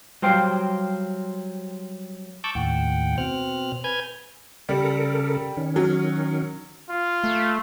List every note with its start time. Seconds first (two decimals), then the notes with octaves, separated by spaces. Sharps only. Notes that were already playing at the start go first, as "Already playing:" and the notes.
0.22 F#3 G3 C5 F5 G5
2.44 A5 C#6 D6 E6 F#6 G6
2.55 D#2 A2 F#5 G5
3.18 B2 C4 F6 F#6
3.84 B4 G#5 F6 G6 G#6
4.69 C#3 G3 A4 A#4
5.57 D#3 C#4
5.76 F#3
6.90 F4
7.24 A3